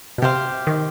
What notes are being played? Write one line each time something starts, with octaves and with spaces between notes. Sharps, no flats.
B2
C3 G4 C5 F5
D#3